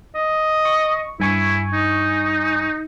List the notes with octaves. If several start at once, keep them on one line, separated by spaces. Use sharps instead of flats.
D#5
C#6
G2 E4 G#5 C#6
D#4